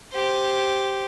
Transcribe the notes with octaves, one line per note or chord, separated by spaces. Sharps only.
G4 C5